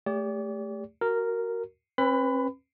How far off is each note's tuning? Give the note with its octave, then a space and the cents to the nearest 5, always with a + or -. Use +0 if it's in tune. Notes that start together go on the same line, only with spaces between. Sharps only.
A3 +0 G4 +30 D5 -40
F#4 +10 A#4 -5
C4 +45 B4 +0 B5 +25